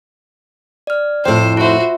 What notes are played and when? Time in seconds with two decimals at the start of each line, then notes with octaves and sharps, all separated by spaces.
0.87 D5 F6
1.25 F2 A2 C5 G5
1.57 F4 F#4 C5 E5